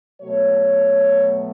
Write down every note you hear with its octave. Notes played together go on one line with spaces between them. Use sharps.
B2 F#3 A3 C#5